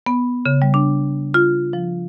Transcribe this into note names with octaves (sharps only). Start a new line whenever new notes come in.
B3
C#3
G3
D4
F4
F3